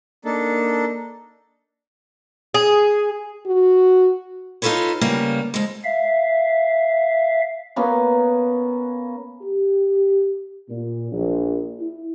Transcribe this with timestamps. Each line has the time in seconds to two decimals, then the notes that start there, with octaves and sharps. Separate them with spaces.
0.25 A#3 D4 D#4 A4
2.54 G#4
3.46 F#4
4.62 D#4 F4 G4 A4 B4 C#5
5.01 C#3 G3 A#3 B3
5.54 F2 G#3
5.84 E5 F5
7.76 A#3 B3 C#4
9.42 G4
10.69 A#2
11.12 A#1
11.80 E4